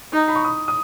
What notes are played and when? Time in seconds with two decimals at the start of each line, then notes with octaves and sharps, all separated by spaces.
0.13 D#4
0.28 B5
0.35 C#6
0.45 D#6
0.68 D#6